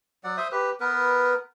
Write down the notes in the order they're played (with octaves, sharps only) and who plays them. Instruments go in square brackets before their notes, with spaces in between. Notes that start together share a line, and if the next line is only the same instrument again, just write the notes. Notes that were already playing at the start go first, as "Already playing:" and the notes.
[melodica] F#3 D5 F#5
C5 E5 D#6
G4 B4
B3 A#4 B4